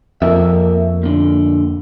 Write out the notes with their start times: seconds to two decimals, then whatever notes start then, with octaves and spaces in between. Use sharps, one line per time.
0.22 F2 A#3 A#4 E5
1.03 A#2 D3